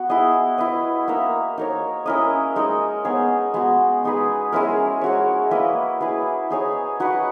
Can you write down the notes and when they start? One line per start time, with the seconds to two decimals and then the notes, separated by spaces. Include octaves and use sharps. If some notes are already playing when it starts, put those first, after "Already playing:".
Already playing: B3 F#4
0.10 E4 G#4 D#5
0.58 E4 B4 D#5
1.08 A#3 D#4 A#4 E5
1.58 D#4 A#4 C#5
2.06 C#4 E4 A#4 D#5
2.56 G#3 D#4 A#4 D#5
3.05 B3 D#4 G#4 C#5
3.54 G#3 B3 F#4
4.04 G#3 D#4 G#4 B4
4.52 G#3 C#4 E4 A#4
5.01 G#3 C#4 F#4 C#5
5.51 A#3 E4 B4 D#5
6.01 E4 G#4 B4
6.50 D#4 G#4 C#5
7.00 D#4 F#4 B4